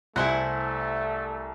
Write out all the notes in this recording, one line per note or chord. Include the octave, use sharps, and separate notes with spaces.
C2 A3 E4 C5 F#5 G#5